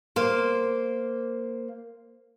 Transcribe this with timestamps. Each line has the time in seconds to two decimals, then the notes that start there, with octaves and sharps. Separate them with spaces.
0.16 A#3 C5